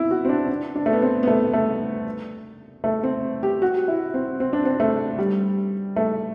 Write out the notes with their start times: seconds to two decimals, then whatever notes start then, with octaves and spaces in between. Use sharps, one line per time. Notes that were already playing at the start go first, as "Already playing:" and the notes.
Already playing: B3 C4 E4
0.11 F#4
0.25 C4
0.29 D4
0.49 D4
0.75 D4
0.86 A3
0.93 B3
1.02 C4
1.23 B3
1.27 A3
1.53 A3
2.84 A3
3.03 C4
3.43 G4
3.62 F#4
3.88 E4
4.14 C4
4.40 C4
4.53 D4
4.65 C4
4.80 A3
5.19 G3
5.96 A3